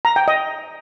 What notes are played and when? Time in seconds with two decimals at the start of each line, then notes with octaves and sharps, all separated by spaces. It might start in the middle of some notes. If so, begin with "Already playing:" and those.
0.05 A#5
0.16 G5
0.28 D#5